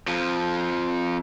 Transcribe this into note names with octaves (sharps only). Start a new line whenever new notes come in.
F2 F3